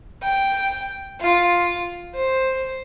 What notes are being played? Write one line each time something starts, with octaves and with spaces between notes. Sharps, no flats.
G5
F4
C5